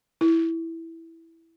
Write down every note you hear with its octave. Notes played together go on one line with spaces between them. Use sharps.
E4